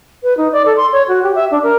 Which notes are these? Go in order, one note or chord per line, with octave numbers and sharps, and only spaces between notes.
B4
D#4
D5
A4
C6
C#5
F#4
G4
E5
D4
A#4